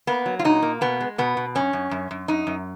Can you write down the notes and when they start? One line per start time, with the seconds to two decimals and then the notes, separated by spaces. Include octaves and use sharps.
0.07 A#3 B3
0.26 F#3
0.39 F4
0.44 A#2 D#4
0.62 A#3
0.81 B2 B3
1.00 G#3
1.18 B2 B3
1.37 B2
1.55 F#2 C#4
1.73 F#2
1.91 F#2
2.11 F#2
2.28 F#2 D#4
2.47 F#2